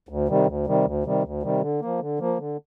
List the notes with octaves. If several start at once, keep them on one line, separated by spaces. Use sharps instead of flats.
D2
C3 D#3 G3
D2
C3 D#3 G3
D2
C3 D#3 G3
D2
C3 D#3 G3
D3
F3 A#3
D3
F3 A#3
D3